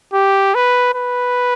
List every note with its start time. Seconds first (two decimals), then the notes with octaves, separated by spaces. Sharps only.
0.14 G4
0.55 B4
0.94 B4